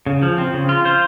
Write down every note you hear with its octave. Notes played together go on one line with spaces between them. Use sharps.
C#3
F3
C4
C#3
F4
C5